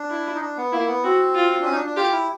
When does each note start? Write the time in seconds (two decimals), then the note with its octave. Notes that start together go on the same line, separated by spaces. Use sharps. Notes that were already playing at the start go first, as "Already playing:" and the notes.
Already playing: D4
0.10 E4
0.35 D#4
0.41 D4
0.57 B3
0.72 A#3 E4
0.88 B3
1.04 C4 F#4
1.35 F4
1.61 D4
1.65 C#4
1.72 D#4
1.76 D4
1.86 D4
1.96 F4 G4
2.12 E4